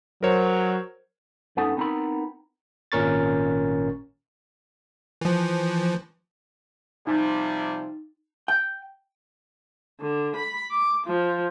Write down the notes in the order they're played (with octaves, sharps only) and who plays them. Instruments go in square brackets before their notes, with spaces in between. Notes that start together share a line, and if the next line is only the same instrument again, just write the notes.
[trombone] F#3 [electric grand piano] A#4 C5 C#5
[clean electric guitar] G2 B3 C#4 D#4 A4 F#5
B3 C4 D#4 E4 A#4 B5
[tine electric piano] G#1 A#2 C#4 A#4 C#6 A6
[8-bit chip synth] E3 F3
[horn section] C3 F3 G3 [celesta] D#4 A6
[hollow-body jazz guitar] G5
[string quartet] D3
B5
D6
F3